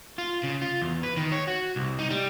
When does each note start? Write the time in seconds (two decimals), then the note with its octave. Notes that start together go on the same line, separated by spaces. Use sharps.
0.18 F4
0.43 C#3
0.62 F4
0.82 E2
1.03 B4
1.17 D#3
1.32 C#5
1.47 F#4
1.76 C2
1.99 D#4
2.10 G3